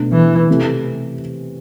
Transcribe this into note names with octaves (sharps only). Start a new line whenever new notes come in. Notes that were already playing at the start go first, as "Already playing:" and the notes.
Already playing: B2 A3 D4
E3
C3 E3 A3